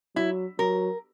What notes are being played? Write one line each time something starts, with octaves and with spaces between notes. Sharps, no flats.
F#3 E4
F#3 A#4